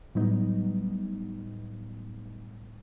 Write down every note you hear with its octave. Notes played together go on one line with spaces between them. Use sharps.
A2 F#3 G3 B3 D#4